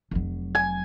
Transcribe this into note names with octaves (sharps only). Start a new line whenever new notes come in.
F1 F#3
G#5